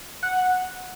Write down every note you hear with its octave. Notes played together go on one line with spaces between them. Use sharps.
F#5